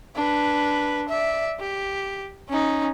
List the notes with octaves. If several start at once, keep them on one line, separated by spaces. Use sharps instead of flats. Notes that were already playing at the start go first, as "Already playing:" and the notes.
D4 B4
D5 E5
G4
C#4 D#4